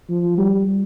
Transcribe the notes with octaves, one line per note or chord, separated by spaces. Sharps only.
F3
G3